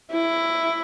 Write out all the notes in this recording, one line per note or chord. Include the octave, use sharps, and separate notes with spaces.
E4